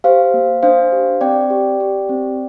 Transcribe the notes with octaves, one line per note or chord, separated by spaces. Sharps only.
G4 C5 F5
A#3
D4 C5 F5
G4
C4 D5 G5
G4
G4
C4